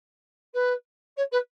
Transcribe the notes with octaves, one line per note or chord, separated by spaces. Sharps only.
B4
C#5
B4